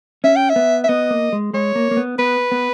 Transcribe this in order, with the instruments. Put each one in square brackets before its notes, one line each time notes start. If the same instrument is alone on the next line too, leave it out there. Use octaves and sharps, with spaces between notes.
[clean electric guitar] C#4 [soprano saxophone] E5
[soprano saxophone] G5
E5
[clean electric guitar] B3
[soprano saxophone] E5
[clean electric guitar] B3 [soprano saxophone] D#5
[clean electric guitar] A#3
G#3
[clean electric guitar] G#3 [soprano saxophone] C#5
[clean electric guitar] A#3
A#3
B3
[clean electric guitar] B3 [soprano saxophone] B4
[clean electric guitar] B3